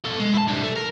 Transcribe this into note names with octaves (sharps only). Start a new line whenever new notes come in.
B2 A4
G#3
E4 A5
G2 C3
A3
A#4